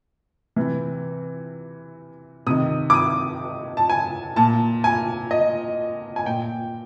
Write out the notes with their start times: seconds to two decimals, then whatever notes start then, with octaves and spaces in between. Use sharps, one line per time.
0.56 C3 E3
2.46 C3 D#3 D#6
2.90 D6
2.94 D#6
3.77 A5
3.90 G#5
4.36 A#2 A5
4.84 G#5
5.31 D#5
6.16 G#5
6.26 A#2 G5